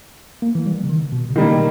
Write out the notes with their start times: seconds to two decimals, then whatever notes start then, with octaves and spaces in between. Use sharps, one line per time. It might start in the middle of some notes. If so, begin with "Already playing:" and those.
0.42 A#3
0.55 E3
0.66 G3
0.84 C#3
0.89 D#3
1.12 B2
1.30 C#3
1.36 B2 D#3 G3 A#3